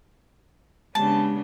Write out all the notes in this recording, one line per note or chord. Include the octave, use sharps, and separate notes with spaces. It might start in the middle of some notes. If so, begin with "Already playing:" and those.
C#3 G#3 B3 D4 G4 A5